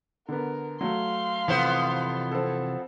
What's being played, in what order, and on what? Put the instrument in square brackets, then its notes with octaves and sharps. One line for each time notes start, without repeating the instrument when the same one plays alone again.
[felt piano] D3 B3 [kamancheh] A#4
[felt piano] F#3 A3 [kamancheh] F5 C6
[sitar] F2 B3 C5 [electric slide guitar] C3 E3
[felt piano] C4 A4